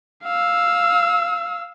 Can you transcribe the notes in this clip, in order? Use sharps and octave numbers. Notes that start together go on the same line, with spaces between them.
F5 E6